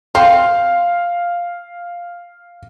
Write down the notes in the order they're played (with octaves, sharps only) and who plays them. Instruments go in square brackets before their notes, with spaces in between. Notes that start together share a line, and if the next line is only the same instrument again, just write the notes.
[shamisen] C4 [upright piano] F5